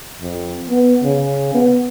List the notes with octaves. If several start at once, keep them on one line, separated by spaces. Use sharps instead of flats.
F2
B3
C#3
B3